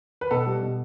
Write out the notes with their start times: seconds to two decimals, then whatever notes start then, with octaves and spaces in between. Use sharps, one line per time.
0.21 B4
0.31 B2 A4
0.47 G3
0.63 B2